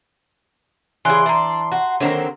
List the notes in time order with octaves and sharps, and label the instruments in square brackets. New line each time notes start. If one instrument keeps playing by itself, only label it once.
[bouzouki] C#3 G#4 [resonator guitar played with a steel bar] E3 D5 [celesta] G#5 F#6 [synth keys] C6
[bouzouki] D4 [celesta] E5 A#5
[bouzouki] F#4
[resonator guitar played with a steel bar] D3 D#3 A#3 [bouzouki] F#3 C4 A#4